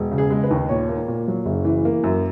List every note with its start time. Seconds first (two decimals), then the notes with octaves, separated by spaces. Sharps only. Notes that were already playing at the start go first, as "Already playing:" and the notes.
Already playing: E1
0.12 C#3
0.18 G#4
0.30 G#3
0.44 B4
0.51 D#2
0.69 A#2 C#5
0.89 A#3
1.08 A#2
1.28 F#3
1.46 F#1
1.65 E3
1.85 A#3
2.04 F#2